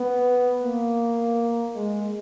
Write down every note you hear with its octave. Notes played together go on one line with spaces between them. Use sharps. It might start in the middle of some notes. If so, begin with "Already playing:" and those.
Already playing: B3
A#3
G#3